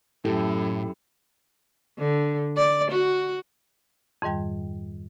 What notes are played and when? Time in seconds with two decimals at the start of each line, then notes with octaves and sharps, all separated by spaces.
0.25 F#2 A2 E4 G4 A4
1.99 D3
2.57 D5
2.91 F#4
4.22 F2 G#2 D#3 G3 G5